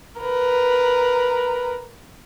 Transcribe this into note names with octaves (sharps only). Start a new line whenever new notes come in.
A#4 B4